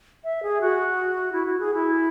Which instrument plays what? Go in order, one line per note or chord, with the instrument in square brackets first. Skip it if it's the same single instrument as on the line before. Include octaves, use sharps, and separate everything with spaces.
[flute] E5
G#4
F#4
E4
F#4
G#4
E4